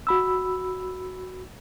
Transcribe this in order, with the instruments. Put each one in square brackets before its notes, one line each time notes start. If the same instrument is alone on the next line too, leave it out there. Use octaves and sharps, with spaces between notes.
[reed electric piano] F#4 B5 E6